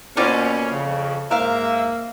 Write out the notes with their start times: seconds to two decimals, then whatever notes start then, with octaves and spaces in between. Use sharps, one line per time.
0.17 B2 A#3 C4 C#4 F4 D5
0.71 F2 C#3
1.31 G#2 A#3 C4 A#4 E5 F5